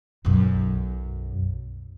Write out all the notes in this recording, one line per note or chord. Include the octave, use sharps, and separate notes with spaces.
B1 F#2